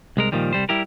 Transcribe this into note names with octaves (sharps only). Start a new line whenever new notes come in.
C2 G#3 A#4
A#2 D#3 F3 G3
C2 G3 C5
G3 E4 G4 A#4